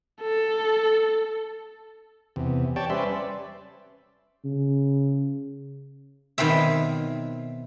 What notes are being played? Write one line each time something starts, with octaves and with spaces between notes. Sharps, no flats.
A4
E2 C3
G4 C#5 D5 G5 A5
G3 C#4 B4 C5 D5 E5
C#3
B2 D#3 F#3 C4 E5